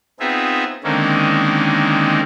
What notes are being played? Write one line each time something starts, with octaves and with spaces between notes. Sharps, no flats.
B3 C4 D#4 F4 G#4 E5
D3 D#3 G#3 A#3 C4 C#4